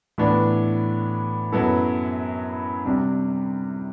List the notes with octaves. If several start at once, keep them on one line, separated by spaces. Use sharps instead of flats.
A2 E3 B3 D4
F#2 F#3 B3 E4 A4
C3 G3 D4